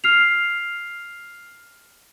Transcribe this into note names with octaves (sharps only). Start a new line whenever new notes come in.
F6 C7 F7